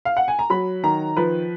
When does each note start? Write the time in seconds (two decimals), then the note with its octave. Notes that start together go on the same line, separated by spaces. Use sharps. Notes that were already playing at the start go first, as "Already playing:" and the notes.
0.05 F5
0.17 F#5
0.28 G#5
0.39 A#5
0.50 F#3 B5
0.84 D#3 A#5
1.17 F3 B4